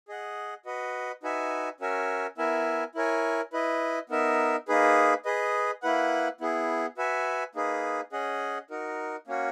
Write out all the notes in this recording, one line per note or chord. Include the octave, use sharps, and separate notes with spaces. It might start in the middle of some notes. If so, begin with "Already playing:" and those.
G#4 D#5 F#5
F#4 B4 D#5
D#4 F#4 B4 E5 G#5
C#4 F#4 A#4 E5 G#5
B3 E4 A#4 E5 G#5
E4 A#4 C#5 G#5
E4 B4 D#5
B3 D#4 A#4 E5
A#3 D#4 G#4 B4
G#4 B4 D#5
A#3 E4 B4 F#5
B3 E4 G#4
F#4 B4 E5 G#5
A#3 D#4 G#4 B4
C#4 G#4 D#5 F#5
D#4 F#4 A#4
A#3 C#4 F#4